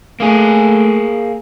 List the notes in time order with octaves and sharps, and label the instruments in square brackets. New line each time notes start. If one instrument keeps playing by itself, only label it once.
[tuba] A3 [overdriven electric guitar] A#3 G#4